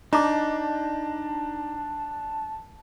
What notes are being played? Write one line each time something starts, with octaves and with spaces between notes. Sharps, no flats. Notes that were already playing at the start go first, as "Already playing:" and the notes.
D4 D#4 A5 A#5 D6